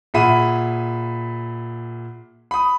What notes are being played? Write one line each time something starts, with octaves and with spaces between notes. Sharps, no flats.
A#2 G#4 E5 F#5 B5 D#7
B5 D#6